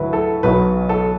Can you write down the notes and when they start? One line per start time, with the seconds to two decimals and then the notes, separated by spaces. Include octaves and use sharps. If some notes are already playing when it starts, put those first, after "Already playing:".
Already playing: D2 F#3 E4 B4
0.13 A4
0.43 B1 B2 F#3 B4
0.89 A4